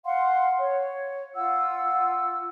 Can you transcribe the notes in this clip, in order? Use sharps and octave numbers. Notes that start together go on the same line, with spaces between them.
F5 F#5 C6
C#5
F4 F#5 E6